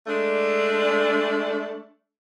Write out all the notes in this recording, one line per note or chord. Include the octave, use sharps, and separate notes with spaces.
G#3 A3 D4